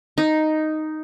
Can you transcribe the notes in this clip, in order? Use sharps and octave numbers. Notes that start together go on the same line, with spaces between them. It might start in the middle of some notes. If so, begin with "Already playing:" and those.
D#4